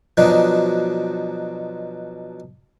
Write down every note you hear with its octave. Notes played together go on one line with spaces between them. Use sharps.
B2 F3 F#3 C4 D4 D#4